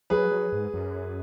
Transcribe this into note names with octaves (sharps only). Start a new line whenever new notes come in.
F#3 G#4 B4
F#3
G#2
F#2